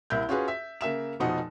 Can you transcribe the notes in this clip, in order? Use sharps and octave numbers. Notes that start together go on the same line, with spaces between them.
C2 A#3 E4 G6
C#4 F4 F#4 G#4 B4
E5
C#3 A#3 E5 E7
F1 B2 F3 D#4 F#5